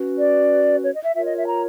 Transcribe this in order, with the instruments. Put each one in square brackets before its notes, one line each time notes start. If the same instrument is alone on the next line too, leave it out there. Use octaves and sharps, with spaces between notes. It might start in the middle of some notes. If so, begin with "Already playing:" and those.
Already playing: [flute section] C#4 F#4 B4
D5
C#5
D#5
E5
F4 A#4 C#5 E5
D#5
E5
A#5